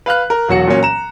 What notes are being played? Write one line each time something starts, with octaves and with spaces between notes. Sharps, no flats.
B4 F5 F6 F#6
A#4
E1 F#3 F#4 C#7
A#2 F#3 C#4
A#5 E7